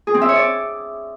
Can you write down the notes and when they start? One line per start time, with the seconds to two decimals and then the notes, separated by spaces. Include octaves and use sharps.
0.07 G#4
0.14 C4
0.21 E5
0.29 C#5
0.36 D5